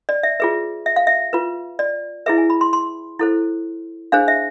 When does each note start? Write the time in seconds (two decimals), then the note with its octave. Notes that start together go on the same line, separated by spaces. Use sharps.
0.09 D5
0.23 E5
0.40 F4 G#4 B4 E5
0.86 E5
0.96 F5
1.07 E5
1.33 F4 B4
1.79 D5
2.26 E4 G#4 B4 E5
2.38 G#5
2.50 B5
2.61 C6
2.73 C6
3.19 E4 A4 C5
4.12 D4 G#4 C5 F5
4.28 E5